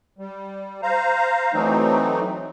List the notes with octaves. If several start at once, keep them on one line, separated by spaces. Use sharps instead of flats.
G3
C5 F5 A#5
E3 F#3 A3 C4 D#4